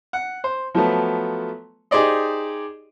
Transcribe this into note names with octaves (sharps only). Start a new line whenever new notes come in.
F#5
C5
F3 F#3 A3 B3
D#4 G4 G#4 C5 D5 D#5